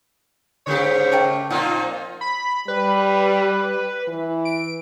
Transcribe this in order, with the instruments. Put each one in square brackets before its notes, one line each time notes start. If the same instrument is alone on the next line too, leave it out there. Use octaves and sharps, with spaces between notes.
[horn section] G#2 C5 C#5 [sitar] C#3 A#3 G4
[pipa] A3 A#4 G5
[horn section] A#2 [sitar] F3 C4 D#4 [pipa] F#5
[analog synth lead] B5
[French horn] G3 [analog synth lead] B4
[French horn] E3
[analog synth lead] D7